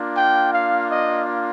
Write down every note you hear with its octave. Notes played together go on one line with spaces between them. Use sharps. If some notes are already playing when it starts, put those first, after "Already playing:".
Already playing: A#3 D4 F4
G5
F5
D#5